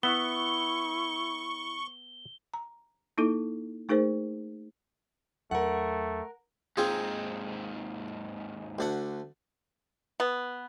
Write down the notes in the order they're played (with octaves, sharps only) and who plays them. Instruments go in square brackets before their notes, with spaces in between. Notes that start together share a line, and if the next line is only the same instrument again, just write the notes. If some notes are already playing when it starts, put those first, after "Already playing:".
[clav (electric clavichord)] B3 E5 F#5 [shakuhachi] E4 [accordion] C#6 [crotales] G7
[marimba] A#5
A#3 D#4 E4 A4
A3 D#4 G#4 A#4 C5
[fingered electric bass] E2 F#3 D4 [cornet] A3 [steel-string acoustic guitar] A#4 F#5
[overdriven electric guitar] D#2 G#2 [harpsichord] C4 F4 G#4
[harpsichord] D2 D4 F#5
[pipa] B3